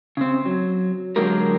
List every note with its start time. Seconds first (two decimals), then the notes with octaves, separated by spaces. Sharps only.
0.17 C#3 C4
0.46 F#3
1.16 D3 F#3 G#3 A#3 G4 A#4